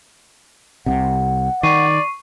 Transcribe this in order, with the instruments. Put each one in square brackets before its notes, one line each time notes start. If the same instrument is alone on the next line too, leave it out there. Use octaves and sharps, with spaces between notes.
[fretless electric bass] C2 C3 [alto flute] F#5
[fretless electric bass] D#3 [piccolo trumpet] D5 [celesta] C#6 C7 D#7